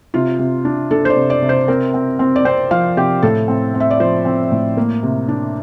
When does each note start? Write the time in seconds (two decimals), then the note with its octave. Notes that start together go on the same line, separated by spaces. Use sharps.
0.14 C3 F4
0.39 C3
0.65 D4
0.91 D4 A4
1.05 C5
1.10 D5
1.17 C3
1.30 D5
1.42 C3
1.49 C5
1.68 C4 A#4
1.94 C4
2.19 C4
2.36 D5
2.45 C4 C5
2.71 F3 F5
2.97 C3 G4
3.22 A2 A4
3.48 C4
3.74 C4
3.80 E5
3.90 D5
4.00 F3 C5
4.25 C4
4.52 A2
4.77 A#3
5.03 C3
5.28 D4